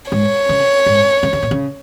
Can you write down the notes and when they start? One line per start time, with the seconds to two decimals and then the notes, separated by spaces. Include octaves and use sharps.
0.11 G#2 C#5
0.49 C#3
0.86 G#2
1.23 C#3
1.33 C#3
1.43 A#2
1.51 C#3